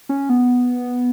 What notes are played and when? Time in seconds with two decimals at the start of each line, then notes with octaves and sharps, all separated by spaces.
0.09 C#4
0.29 B3